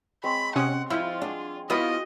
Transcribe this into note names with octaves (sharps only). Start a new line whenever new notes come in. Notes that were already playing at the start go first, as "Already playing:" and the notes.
G#3 C4 C#5 B5
C3 C#4 F#5 D#6
F3 E4 F4
D4 G#4 F#5
F3 B3 E4 F#4 D#5 D#6